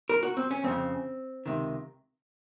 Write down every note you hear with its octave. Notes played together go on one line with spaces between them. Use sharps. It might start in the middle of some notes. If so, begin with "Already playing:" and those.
A#4
F#4
C4
C#4
F2 C#3 C4
C#2 C3 D#3